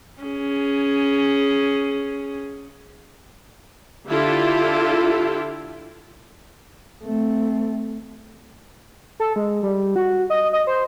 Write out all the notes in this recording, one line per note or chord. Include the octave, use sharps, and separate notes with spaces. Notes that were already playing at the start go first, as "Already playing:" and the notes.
C#4 G#4
D3 E4 F4 G4 A4
A3 C4
A4
G#3
G3
F#4
D#5
D#5
C5